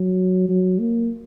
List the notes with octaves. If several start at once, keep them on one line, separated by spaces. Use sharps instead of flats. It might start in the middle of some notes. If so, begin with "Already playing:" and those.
Already playing: F#3
F#3
A#3